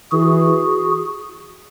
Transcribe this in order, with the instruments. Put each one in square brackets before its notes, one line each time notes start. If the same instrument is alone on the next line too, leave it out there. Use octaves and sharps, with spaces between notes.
[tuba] E3 [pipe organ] F#4 G#4